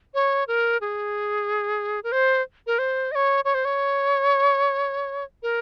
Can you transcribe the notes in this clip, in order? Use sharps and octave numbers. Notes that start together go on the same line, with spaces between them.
C#5
A#4
G#4
A#4
C5
A#4
C5
D#5
C#5
C#5
C5
C#5
A#4